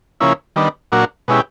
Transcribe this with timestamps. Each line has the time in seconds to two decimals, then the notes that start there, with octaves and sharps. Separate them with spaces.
0.20 C#3 F3 A#3 C#4 E4
0.56 D#3 G3 B3 D4
0.92 A#2 F#3 A#3 D4 F#4
1.28 B2 G#3 C#4 E4 G4